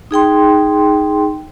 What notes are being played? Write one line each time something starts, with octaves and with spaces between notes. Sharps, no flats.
D#4 G#4 G5 C6